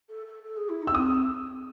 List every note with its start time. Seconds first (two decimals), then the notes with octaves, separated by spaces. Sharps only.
0.09 A4
0.25 A4
0.43 A4
0.56 G#4
0.68 E4
0.82 D#4
0.87 E6
0.94 C4 D#6